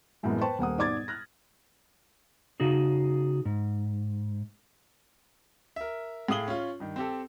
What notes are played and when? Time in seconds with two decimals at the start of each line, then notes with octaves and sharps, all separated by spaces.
0.23 F#2 A2 E3 G#3 A#3 B3
0.41 B4 C5 G5 A5 C#6
0.59 D#1 A#3 F#5 D#6
0.78 G#2 B2 D5 D6 G#6 A6
1.08 F6 F#6 A#6
2.60 C#3 D#4 F#4 G#4
3.45 G#2
5.76 A#4 E5
6.29 A2 G#4 F5 D#6 F#7 G7
6.48 C#4 F4
6.80 G2 D#3
6.96 C4 G4 A4